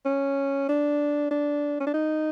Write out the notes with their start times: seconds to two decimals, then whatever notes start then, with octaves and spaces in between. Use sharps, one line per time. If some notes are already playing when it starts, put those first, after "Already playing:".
0.05 C#4
0.69 D4
1.31 D4
1.80 C#4
1.87 D4
1.94 D#4